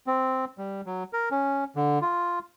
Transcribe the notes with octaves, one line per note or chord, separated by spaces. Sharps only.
C4
G3
F#3
A#4
C#4
D3
F4